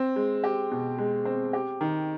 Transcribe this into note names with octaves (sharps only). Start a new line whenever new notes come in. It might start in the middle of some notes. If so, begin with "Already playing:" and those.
Already playing: C4
G#3
G4
B2
G#3
C4
G4
D#3